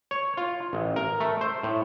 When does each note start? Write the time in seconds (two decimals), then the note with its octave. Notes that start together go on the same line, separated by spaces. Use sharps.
0.11 C#5
0.37 F4
0.73 A1
0.96 A#4
1.20 A3
1.41 C5
1.63 A2